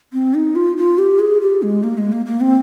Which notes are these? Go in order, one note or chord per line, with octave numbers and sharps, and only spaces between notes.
C4
D#4
F4
F4
G4
G#4
G4
G#3
A#3
G#3
A#3
A#3
C4